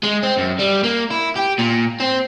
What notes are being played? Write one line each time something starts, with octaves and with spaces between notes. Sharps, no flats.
G#3
C4
F#2
G3
A#3
E4
G4
A#2
C4